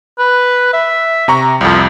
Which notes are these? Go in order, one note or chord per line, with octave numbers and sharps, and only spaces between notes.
B4
E5
C3 A#5 C#6
C2 F2 F3